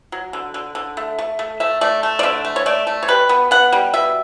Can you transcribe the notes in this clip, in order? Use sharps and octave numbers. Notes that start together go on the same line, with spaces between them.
F#3
D3
D3
D3
A3
A3
A3
A3 E5
A3 D5
A3
D5
D3 E5
A3
C#5
A3 D5
A3
C#5
G3 B4
B3
B3 F#5
G3
B2 E5